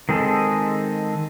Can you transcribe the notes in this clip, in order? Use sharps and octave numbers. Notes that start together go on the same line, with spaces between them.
D#3 G#3 C4 G#4 A4